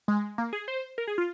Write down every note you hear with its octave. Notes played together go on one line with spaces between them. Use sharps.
G#3
A#3
G#4
C5
A#4
G#4
F4